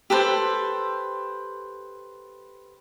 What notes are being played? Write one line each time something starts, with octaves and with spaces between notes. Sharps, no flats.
G4 A4 B4 C5